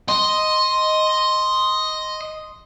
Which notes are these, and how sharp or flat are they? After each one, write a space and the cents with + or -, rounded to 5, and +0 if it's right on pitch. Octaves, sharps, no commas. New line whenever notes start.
D#5 +0 C6 +0